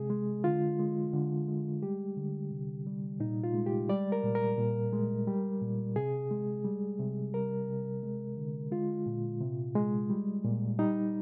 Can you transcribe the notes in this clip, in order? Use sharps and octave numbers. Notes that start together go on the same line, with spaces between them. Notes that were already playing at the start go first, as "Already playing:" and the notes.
Already playing: C3 G#3 G#4
G#3
D3 F4
G#3
D3
G#3
G3 G4
D3
C3
G3
A#2 D#4
F4
G#3
G4
G3 D5
A#4
A#2
A#4
A#2
G#3
G3
A#2
C3 G#4
G#3
G3
C3
G3 A#4
C3
G#3
D3
G#3 F4
A#2
C3
G#3
G3
A#2
G3 D#4